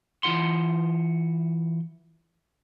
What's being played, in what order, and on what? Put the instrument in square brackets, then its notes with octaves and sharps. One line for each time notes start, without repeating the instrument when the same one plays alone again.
[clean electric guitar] E3 E4 F4 F#5 C6